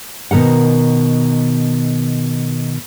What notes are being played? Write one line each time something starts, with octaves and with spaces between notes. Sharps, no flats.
B2 D#3 A#4 F#5